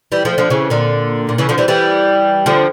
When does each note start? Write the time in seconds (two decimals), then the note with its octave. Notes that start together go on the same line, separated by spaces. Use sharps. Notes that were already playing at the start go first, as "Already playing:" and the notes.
0.12 E3 G3
0.25 F3 A3
0.38 D3 F3
0.50 C#3 E3
0.70 A#2 D3
1.29 A#2
1.38 C#3 E3
1.49 D3 F3
1.58 E3 G3
1.68 E3 G3
2.46 D3 F3